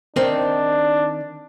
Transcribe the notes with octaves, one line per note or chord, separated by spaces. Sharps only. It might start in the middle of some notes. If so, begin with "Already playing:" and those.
D#3 C4 D4 D#4